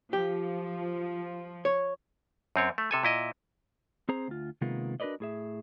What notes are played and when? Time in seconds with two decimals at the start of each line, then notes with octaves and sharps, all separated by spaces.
0.13 F3 G4
1.65 C#5
2.56 F#2 C4 C#5
2.78 A3
2.91 C3 A4 G#5
3.03 A#2 E4 D#5
4.09 C4 G#4 C5 A#5
4.28 D2 F4
4.61 C3 D#3 G#3 A#3 B3 F4
5.00 D4 F#4 A#4 B4 D5 D#5
5.20 A2 G#4 E5